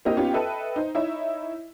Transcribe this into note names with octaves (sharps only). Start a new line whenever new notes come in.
A#3 C4 E4 G4 D#5
B3 C#4 D#4 F4 G4
A4 B4 D#5 E5 G5
D#4 C5
D#4 E4 C#5 E5